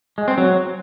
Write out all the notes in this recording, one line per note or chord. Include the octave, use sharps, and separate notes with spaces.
G#3
C4
F#3